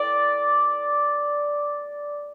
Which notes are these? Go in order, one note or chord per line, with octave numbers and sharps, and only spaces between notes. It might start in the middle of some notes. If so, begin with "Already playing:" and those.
Already playing: D5